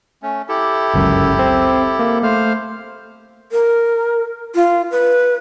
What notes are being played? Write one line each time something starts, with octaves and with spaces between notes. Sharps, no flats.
A3 C#4
E4 G4 A4
G1 C#2 F#2
C4
A#3
A3 C5 F5 F6
A#4
F4
B4